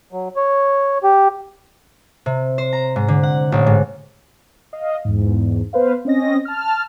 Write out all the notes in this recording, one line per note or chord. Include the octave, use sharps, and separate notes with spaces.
F#3
C#5
G4
C3
C5
A#5
G#2
D3
F#5
A1
G#2
D#5 F5
E2 G#2
B3 B4 C5 F5
C4 C#4 D#5 A#6
A5 F6